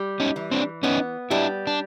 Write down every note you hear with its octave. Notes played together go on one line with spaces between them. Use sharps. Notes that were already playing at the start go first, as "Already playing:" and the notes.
Already playing: G3
C#4 D#4
E3
C4 D4
B3 C#4 D#4
G3 D4 E4
D4